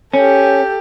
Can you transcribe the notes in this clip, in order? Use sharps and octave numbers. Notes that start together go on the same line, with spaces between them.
C#4 G4 A4